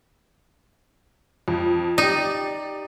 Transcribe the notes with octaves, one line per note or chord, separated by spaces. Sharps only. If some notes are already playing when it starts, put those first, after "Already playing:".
F2
D#4 G4 D5